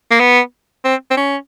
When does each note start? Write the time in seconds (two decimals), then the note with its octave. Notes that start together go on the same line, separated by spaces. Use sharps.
0.11 A#3
0.20 B3
0.85 C4
1.11 C4
1.17 C#4